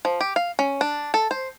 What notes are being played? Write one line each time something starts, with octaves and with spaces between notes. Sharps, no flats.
F3
G4
F5
C#4
D4
A4
C5